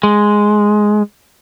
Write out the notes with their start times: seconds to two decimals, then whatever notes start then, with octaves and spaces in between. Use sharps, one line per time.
0.03 G#3